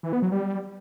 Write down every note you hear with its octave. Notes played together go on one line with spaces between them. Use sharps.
E3
B3
F#3
G3